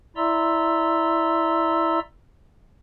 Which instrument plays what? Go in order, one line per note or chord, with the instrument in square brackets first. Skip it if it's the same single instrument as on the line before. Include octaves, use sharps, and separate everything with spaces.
[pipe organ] E4 D5 E5 A#5 C6 E6